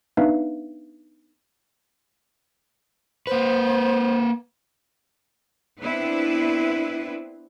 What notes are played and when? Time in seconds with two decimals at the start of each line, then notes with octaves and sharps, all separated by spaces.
0.17 B3 D4 D#4 B4 E5 F5
3.27 A#3 B4 C5
5.82 B3 C4 D4 E4 B4